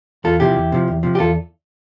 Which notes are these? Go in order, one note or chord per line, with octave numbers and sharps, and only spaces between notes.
E2 F4 A4
C3 F3 E4 G4
E2
C3 F3
E2
C3 F3
G4
E2 F4 A4